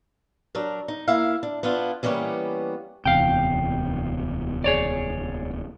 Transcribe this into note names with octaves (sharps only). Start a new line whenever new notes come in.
F#3 D4 A#4
D#4
A#3 E4 E5 F5
D4
B3 D4 E4 F4
E3 G3 A#3 B3 C#4
D1 E2 C3 F5 G5
G#4 C#5 D5